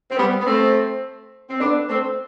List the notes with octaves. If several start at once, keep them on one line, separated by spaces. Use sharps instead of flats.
C4
G3 B3
B3
A3 C4
C4
B3 D4
A3 C4